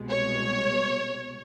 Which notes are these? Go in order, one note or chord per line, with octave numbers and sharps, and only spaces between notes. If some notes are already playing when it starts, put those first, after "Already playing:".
Already playing: C2 B2 G#3
C#5